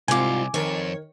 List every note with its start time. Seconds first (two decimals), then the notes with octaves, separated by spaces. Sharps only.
0.08 C2 G#2 C3 F4 G#5 D6
0.54 F2 D#3 A#4 C#5